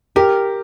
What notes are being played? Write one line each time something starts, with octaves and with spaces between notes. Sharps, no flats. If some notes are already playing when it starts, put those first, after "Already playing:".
G4 A#4